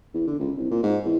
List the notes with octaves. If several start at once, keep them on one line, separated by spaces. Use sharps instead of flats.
E2
D3
C#2
C2
A#2
G#2
E2